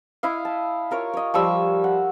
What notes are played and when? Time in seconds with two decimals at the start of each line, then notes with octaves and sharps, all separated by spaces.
0.23 E4 D#5 F5
0.45 A5
0.91 F4 A#4 C#5
1.14 C#5 D#5
1.34 F3 G3 C#6 E6
1.84 F#5